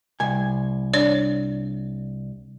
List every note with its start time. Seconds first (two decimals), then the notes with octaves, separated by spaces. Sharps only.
0.20 C2 G#5
0.94 D4 C#5 D5